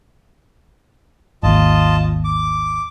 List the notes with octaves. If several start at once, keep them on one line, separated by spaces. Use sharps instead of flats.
G#1 D#2 F4 D#5 A5
D6